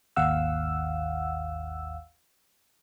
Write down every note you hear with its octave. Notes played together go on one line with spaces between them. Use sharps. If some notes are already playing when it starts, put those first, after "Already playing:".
G#1 D#2 F5 F#5 E6